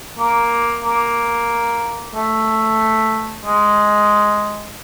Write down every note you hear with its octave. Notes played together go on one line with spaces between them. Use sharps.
A#3
A#3
A3
G#3